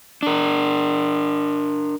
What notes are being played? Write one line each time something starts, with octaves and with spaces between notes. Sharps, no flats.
D4 A#4